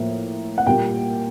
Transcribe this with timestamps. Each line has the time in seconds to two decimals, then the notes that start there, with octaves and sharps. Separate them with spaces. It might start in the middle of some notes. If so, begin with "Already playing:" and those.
Already playing: A2 F3 A#3
0.58 F#5
0.67 A#2 G3 A#3 G5